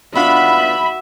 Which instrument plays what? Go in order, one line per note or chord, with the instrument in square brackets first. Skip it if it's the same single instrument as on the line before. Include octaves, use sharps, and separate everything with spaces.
[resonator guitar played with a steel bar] B3 D4 F4 [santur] F#4 B4 [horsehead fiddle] E5 [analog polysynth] B5